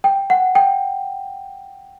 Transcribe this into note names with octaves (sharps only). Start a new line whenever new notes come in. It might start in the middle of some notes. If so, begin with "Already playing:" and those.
G5
F#5
G5